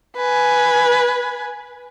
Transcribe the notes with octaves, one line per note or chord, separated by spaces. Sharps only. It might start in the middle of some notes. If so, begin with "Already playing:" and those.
B4 G#5